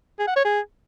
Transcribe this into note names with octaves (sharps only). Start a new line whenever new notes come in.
G#4
F#5
C#5
G#4